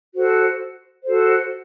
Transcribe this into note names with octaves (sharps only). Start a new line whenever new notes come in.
F#4 A4 C5
F#4 A4 C5